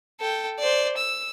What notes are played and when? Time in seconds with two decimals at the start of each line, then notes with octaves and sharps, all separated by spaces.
0.20 A4 G5
0.59 C5 D5
0.97 E6